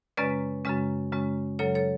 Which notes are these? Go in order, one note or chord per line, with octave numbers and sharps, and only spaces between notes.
F#2 C#3 G#3 C#4 B4 D5
F#2 C#3 G#3 C#4
F#2 C#3 G#3 C#4
F#2 C#3 F#3 A4 C#5
A4 C#5